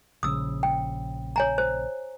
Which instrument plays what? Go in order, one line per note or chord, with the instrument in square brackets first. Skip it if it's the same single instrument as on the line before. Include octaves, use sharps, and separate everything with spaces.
[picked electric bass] A#1 C#3 [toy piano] D#6 E6
[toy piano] G5
C#5 G#5 A#5
C5